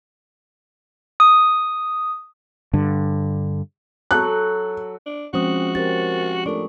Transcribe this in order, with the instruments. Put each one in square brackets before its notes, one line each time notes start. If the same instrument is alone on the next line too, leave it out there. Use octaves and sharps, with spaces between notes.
[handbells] D#6
[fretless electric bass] G2 D3
[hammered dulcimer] F#3 A4 [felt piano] F#6
[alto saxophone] D4
[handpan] F3 G#3 C4 [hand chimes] C#4 C5 D#6 [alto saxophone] F#4
[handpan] C4 C#4 G4 [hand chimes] A#4 C5 A6
[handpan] A3 F4 A#4 [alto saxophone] D4 [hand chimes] A4 C#6